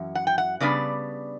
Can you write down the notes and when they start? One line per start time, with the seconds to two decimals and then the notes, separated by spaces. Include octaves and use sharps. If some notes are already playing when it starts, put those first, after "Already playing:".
Already playing: F#2 E3
0.15 F#5
0.27 G5
0.38 F#5
0.60 C#3 G3 B3 D4 D5